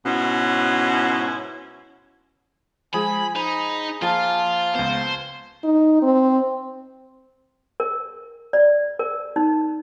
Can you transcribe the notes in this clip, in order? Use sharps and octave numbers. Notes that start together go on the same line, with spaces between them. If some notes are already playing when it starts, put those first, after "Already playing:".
G#2 B2 C#4 E4
F3 G#3 G#4 G#5 B5
D#4 C5 B5
F3 A#3 F4 F5 G#5 A5
C#2 B3 C5
D#4
C4
A#4
D5
A#4
D#4